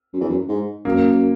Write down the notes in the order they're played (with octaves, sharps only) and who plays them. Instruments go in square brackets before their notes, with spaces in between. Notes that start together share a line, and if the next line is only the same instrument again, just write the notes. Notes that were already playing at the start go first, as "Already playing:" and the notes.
[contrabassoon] F#2
E2
F#2
G#2
[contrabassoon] F#2 [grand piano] A#3